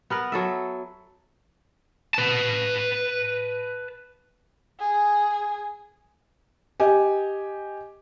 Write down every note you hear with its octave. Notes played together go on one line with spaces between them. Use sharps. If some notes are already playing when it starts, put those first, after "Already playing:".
B3 A#4 B4
F#3 A4 E5
B4 A5
G#4
G4 D#5 G#5